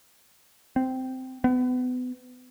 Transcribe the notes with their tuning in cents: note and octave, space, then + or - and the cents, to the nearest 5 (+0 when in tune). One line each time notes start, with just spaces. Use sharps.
C4 -10
B3 +30